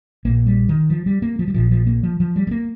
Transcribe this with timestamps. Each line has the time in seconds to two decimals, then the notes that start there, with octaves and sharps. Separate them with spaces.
0.25 A#1 A#2 A#3
0.46 G3
0.69 D#3
0.90 F3
1.06 G3
1.22 A#3
1.39 F3
1.48 G3
1.54 A#1 A#2 F3
1.71 F3
1.86 A#3
2.03 F3
2.20 F3
2.36 G3
2.47 G3
2.51 A#3